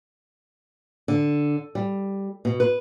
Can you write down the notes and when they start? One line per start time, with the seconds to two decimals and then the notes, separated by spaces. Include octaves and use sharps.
1.08 D3
1.75 G3
2.45 B2
2.60 B4